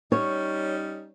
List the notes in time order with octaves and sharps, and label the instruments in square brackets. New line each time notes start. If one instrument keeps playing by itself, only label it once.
[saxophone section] G3 C#4 D#4 [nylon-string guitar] C#5